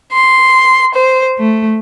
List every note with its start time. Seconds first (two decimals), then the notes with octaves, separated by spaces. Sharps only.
0.13 C6
0.94 C5
1.40 A3